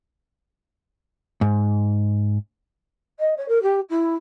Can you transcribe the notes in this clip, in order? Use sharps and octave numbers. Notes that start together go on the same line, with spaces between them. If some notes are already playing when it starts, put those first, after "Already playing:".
G#2
D#5
C#5
A#4
G4
E4